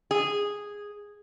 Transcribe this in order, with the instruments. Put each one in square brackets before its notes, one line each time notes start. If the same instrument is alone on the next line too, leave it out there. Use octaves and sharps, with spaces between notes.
[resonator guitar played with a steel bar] G#4